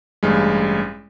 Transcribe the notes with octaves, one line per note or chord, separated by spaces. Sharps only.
A1 G2 G#3